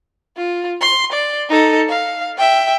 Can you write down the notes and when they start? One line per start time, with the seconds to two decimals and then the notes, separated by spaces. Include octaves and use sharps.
0.37 F4
0.82 C6
1.12 D5
1.49 D#4 A4
1.89 F5
2.38 E5 G5